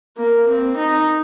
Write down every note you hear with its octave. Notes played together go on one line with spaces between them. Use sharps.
A#3
C4
D#4